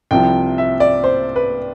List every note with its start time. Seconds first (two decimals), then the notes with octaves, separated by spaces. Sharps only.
0.11 C2 C3 F3 G5
0.58 E5
0.80 D5
1.04 C5
1.36 B4